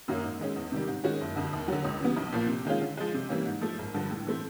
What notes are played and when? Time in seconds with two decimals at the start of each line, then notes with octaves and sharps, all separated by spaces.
0.08 F#2 D#3 F#3 A#3
0.23 G#2
0.39 D#3 G#3 C#4
0.56 E2
0.72 C3 D#3 G3
0.88 G#2
1.04 D#3 G#3 C#4 F#4
1.21 F#1
1.36 F2 D3
1.53 D#2
1.68 D3 F#3
1.84 C#2
2.01 C#3 E3 G3 B3
2.16 B1
2.32 A#2 F3 A#3
2.49 C3
2.65 D#3 G#3 C#4 F4
2.81 D3
2.97 F3 G#3
3.14 C3
3.29 E3 G3 A#3 C#4
3.45 G#2
3.61 F3 A3
3.79 G#1
3.94 G2 D3 F3
4.10 A2
4.27 E3 A3 C4